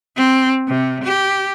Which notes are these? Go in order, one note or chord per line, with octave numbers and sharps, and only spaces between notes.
C4
C3
G4